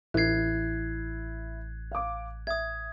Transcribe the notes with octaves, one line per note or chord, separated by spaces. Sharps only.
A1 E4 F#6 G#6 C7
F5 D6
E5 D#6 G#6